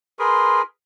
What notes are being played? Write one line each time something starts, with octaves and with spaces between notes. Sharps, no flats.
G#4 A#4 B4 C6